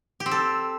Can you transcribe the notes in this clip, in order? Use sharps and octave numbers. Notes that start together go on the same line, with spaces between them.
G4
C4
A4